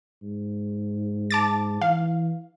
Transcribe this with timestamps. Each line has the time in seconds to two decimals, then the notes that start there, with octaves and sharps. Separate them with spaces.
0.23 G#2
1.30 A5 D6 A6
1.81 E3 F5